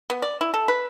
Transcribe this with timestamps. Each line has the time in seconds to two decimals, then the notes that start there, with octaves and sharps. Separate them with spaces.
0.10 B3
0.22 D5
0.41 E4
0.54 A4
0.68 B4